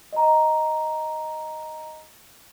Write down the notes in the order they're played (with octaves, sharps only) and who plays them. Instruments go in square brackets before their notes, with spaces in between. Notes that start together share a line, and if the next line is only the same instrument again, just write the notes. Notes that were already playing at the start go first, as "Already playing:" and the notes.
[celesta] D#5 A#5